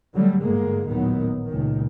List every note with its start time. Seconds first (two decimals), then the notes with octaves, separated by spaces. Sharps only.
0.14 D3 F#3 G3 A3
0.44 G1 G#2 D3 G#3 A#3
0.87 A1 D#2 A#2 D#3 F#3 B3
1.46 C#2 A#2 D#3